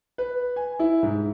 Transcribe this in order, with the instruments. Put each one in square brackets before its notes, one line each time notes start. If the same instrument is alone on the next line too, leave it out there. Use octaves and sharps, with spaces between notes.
[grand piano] B4
G#5
E4
G#2